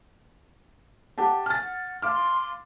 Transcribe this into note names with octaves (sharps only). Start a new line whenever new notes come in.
G4 F#5 A5
G#5 F6 A6
F#5
F5 C6 D6 F6